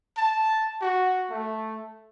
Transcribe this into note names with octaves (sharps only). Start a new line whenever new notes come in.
A5
F#4
A3